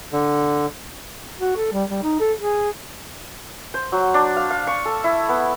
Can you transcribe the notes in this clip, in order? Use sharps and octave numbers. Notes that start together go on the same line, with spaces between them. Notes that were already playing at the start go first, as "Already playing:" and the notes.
D3
F#4
A4
G3
G3
D#4
A4
G#4
C5
F#3
D4
F5
F5
C#6
A4
E4
B3